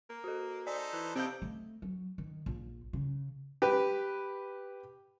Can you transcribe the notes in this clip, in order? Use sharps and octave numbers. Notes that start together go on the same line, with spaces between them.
A#3
F#4 A4
D#4 A4 C5 D5
E3
C3 C4 A4 D#5 F5 A5 G6 D7
A3
F#3
D#3
A#1
C#3
G4 B4